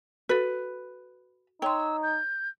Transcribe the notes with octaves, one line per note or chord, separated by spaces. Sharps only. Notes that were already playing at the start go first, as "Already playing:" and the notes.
F#4 A4 B4
D#4 C#5 G5 C6 E6
G6